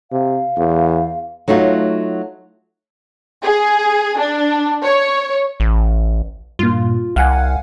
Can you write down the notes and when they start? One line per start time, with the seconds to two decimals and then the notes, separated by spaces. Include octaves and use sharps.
0.11 C3 F5
0.57 E2
1.48 F#3 A3 D#4 F4 F#4
3.43 G#4
4.19 D4
4.83 C#5
5.60 A1
6.59 G2 A#2 F4
7.16 C2 F5 F#5 G#5